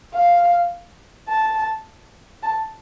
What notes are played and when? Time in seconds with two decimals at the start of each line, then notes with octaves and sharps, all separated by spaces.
0.14 F5
1.29 A5
2.43 A5